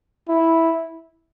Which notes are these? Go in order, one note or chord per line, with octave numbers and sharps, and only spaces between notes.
E4